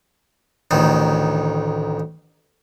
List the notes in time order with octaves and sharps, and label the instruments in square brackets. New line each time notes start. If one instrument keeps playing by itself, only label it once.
[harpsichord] A1 D2 D#3